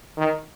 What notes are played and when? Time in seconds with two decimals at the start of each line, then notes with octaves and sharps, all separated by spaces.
0.18 D#3